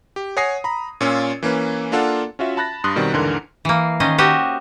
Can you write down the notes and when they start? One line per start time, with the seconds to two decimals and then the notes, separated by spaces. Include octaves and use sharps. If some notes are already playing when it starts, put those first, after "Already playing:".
0.16 G4
0.37 C#5 F#5 G#5 D#6 A#6 C7
0.64 A#5 B5
1.01 A#2 C#4 F4 E6
1.43 E3 A#3 C#4 B4
1.92 A#3 D4 F4 A4 F5 F#5
2.39 C#4 F4 F#4 E5
2.57 A5 B5 F#6 A6 A#6
2.84 G2 C6 D#6 F#6
2.96 B2 D#3 G3 C4
3.13 D#2 G#2 D3 E3 A#4 C6
3.65 E3 A#3
4.00 D#3 C#4 C5 D#5
4.18 F#4 G4 D#5 E5